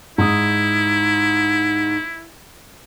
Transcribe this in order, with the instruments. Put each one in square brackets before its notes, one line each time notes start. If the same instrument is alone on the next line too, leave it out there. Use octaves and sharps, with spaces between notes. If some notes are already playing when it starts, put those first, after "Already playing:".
[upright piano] G#2 D#6 [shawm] E4